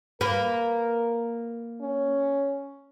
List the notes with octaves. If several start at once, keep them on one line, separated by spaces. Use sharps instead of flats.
A#3 A#4 B4
C#4